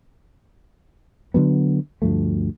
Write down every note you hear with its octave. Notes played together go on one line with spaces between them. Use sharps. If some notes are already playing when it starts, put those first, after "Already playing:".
D3 E3 F#3 B3
D2 G2 F3 A3